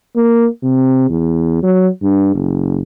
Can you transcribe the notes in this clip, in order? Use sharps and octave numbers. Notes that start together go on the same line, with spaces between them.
A#3
C3
E2
F#3
G2
F#1